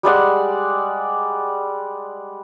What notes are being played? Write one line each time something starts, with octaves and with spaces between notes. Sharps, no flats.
G3 G#3 D5 F#5